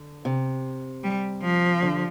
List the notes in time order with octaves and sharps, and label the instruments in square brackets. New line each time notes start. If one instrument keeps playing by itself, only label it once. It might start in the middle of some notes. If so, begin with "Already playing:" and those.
Already playing: [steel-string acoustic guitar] D3
C3
[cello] G3
F3
[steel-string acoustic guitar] D3